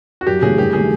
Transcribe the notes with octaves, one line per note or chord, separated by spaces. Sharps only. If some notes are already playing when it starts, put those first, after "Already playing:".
F#4
F#2 G4
C#3 E3 A3 G#4
G1 G4
D#3 F#3 A3 G#4